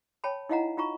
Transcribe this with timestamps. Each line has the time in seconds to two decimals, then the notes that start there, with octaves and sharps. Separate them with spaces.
0.24 C#5 G5 A5 B5
0.49 D#4 E4 D#5 F5 F#5 A#5
0.77 D#4 F4 A#5 C#6